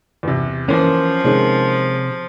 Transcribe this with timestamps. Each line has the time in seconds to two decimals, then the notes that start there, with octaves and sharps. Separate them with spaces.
0.23 E2 C3
0.69 E3 F3 A#3 C#4 C5
1.24 C3 D#3 G#3 C#4